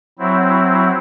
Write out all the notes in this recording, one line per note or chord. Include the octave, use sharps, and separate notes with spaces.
F#3 C4 E4